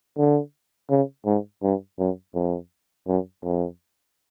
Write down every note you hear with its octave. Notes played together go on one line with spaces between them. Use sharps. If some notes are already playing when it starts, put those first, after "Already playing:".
D3
C#3
G#2
G2
F#2
F2
F#2
F2